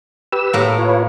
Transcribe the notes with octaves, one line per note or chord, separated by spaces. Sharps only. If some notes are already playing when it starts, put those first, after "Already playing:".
G4 B4 E6
A2 A#3
F4 B4 C#5